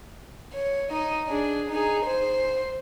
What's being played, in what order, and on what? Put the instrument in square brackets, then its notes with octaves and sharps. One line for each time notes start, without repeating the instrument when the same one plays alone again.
[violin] C#5
D#4 D#5
D4 G#4
D#4 G#4
C5